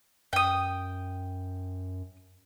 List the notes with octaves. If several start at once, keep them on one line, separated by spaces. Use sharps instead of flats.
F#2 G5 D#6